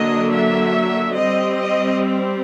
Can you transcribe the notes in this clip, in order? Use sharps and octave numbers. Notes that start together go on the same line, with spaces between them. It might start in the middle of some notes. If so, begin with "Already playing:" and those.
Already playing: D3 F#3 A#3 D4 D#5
E5
G3 C4 D#5
D#5